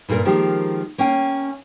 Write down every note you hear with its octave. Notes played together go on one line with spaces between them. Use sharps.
G2 A#2 F4 A4 A#4
D#3 F3 G#3 A#3 G4
A#3 C#4 F5 G5 G#5